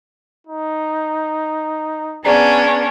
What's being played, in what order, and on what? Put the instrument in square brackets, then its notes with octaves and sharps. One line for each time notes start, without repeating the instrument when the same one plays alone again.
[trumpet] D#4
[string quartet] B3 C#4 D4 [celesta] G#4 D5 A#5